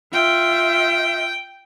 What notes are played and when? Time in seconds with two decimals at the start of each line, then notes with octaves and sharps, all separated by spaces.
0.13 F4 E5 G5